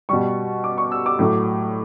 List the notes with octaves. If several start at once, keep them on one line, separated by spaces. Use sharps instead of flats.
B2 G3 C#6
D6
C#6
E6
D6
A2 F#3 A3